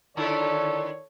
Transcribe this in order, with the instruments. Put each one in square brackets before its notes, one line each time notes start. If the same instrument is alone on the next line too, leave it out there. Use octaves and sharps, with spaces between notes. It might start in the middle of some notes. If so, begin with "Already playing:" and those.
[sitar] D3 E4 F4 [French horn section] D#3 D5 [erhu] A4 [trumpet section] C#5